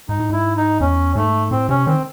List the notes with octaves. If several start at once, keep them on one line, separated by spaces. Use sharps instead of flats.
G#2 D#4
A2
G#2 E4
D#4
E2 C#4
G#2 A3
A2 C4
C3 C#4
D#3 C4